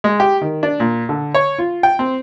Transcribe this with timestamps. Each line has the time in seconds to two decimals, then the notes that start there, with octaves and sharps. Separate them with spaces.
0.04 G#3
0.20 G4
0.41 D#3
0.63 D4
0.80 A#2
1.09 D3
1.34 C#5
1.59 F4
1.83 G5
1.99 C4